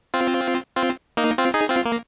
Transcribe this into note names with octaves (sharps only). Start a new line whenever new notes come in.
C4 F4
C4 F4
A#3 D#4
C4 F4
D#4 G#4
C4 F4
A#3